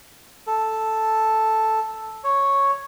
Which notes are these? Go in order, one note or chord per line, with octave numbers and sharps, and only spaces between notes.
A4
C#5